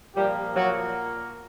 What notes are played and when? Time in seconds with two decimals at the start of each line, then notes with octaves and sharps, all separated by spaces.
0.14 A#2 F3 G3 A#3 G4
0.55 F#3 F#4